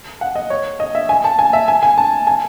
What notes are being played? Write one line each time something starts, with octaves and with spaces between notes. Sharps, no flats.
F#5
D#5
C#5
D#5
E5
G#5
A5
G#5
E5
G#5
G#5
A5
G#5